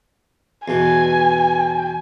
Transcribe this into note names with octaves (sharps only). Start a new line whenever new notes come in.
E2 B2 G#5